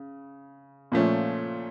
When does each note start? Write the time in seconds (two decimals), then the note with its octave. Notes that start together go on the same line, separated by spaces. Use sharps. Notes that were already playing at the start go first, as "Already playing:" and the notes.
Already playing: C#3
0.92 A#2 F3 A3 C#4